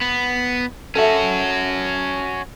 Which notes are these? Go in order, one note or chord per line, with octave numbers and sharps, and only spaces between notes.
B3
C#4 F#4 A4 E5